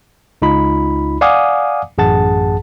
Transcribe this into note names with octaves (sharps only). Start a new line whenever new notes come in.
C#2 D#4 F4 B5
D5 F5 F#5 G#5 D6 D#6
A1 F#2 G#4 F#5 A5 A6